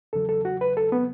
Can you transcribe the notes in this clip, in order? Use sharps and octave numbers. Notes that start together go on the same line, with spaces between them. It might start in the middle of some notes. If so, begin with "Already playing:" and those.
E2 C#3 F#3 A4
A4
F#4
B4
A4
B3